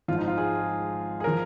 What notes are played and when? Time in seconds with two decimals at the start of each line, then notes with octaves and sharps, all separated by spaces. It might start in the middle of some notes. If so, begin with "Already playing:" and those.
0.08 G#1 G#2 F3 F4
0.18 D#4
0.28 F4
0.38 G#4
1.20 G#4
1.24 F3 A#4